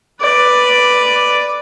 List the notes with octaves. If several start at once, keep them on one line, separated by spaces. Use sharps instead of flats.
B4 D5